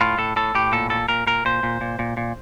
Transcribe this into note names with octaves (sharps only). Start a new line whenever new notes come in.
A2 F4
A2 A4
A2 A4
A2 G4
A#2 A4
A#2 A4
A#2 A#4
A#2 A#4
A#2 C5
A#2
A#2
A#2
A#2